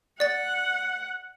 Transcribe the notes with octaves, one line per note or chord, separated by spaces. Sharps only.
D5 F#5 A6